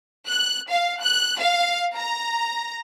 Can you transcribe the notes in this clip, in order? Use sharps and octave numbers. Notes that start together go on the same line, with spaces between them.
F#6
F5
F#6
F5
A#5